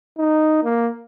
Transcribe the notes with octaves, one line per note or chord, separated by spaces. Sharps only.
D#4
A#3